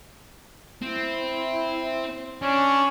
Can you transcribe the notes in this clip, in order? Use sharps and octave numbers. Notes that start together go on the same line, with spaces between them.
C4 E4
C#4 D4